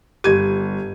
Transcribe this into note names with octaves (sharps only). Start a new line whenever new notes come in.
G1 G4 G#6 D#7